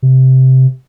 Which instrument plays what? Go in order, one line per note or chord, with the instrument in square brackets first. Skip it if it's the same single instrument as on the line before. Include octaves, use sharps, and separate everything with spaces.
[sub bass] C3